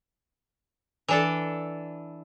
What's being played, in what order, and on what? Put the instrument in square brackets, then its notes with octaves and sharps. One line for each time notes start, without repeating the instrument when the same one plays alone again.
[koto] E3 D4 A4